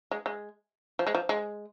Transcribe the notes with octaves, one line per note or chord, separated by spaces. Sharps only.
G#3
G#3
F3
G#3
F3
G#3